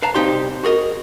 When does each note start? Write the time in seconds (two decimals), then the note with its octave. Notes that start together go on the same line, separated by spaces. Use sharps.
0.02 B4 F5 A5 A#5
0.14 C2 C4 D#4 G4 F5 C6
0.63 F#4 G#4 A#4 D#5